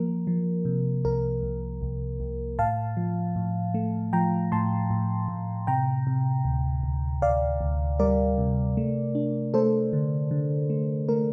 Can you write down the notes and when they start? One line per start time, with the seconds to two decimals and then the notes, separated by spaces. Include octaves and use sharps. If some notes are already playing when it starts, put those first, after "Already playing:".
Already playing: F3 A#3 A#4
0.27 F3
0.65 C3
1.05 C2 A#4
1.43 C2
1.82 C2
2.20 C2
2.59 A2 F5 A5
2.97 F3
3.36 A2
3.74 A3
4.13 F3 G5 A#5
4.52 A2 A5 C6
4.90 A2
5.28 A2
5.67 C3 G5 A#5
6.07 C3
6.45 D2
6.83 D2
7.22 D2 D5 F5
7.61 D2
7.99 G3 A#4 D5
8.38 C3
8.77 A3
9.15 D4
9.54 A3 A4 C5
9.93 D3
10.31 D3
10.70 A3
11.09 A3 A#4